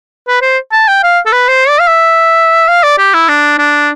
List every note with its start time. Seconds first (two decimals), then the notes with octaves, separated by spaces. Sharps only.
0.28 B4
0.42 C5
0.72 A5
0.88 G5
1.03 F5
1.26 A4
1.32 B4
1.48 C5
1.68 D5
1.80 F5
1.88 E5
2.68 F5
2.83 D5
2.98 G4
3.14 E4
3.28 D4
3.58 D4